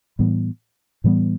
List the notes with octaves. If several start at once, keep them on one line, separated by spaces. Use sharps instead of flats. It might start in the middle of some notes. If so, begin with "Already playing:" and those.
A2 E3 G3 B3
A2 E3 G3 B3